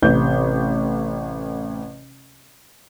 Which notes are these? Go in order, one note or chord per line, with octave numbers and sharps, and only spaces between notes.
A1 C3 G6